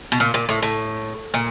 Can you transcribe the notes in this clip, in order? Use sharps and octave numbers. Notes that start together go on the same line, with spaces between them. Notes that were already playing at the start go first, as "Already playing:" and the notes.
B2
A#2
A#2
A2
A2
A#2